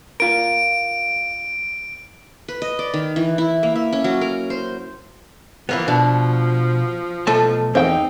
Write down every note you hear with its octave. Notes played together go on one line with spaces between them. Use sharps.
F4 A#4 D7
B4
D#5
D5
D#3
E3
E4
A#3
E5
C#4
F#3
A#4
C5
E3 F3 A#3 B3
B2 D4
B1 A3 A5
E2 C4 D#4 G5